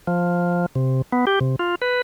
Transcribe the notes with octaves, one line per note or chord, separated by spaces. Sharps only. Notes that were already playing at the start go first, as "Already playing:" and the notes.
F3
C3
B3
G4
C3
F4
B4